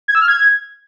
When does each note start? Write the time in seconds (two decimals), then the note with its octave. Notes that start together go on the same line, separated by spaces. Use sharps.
0.08 G#6
0.15 E6
0.22 F6
0.28 G#6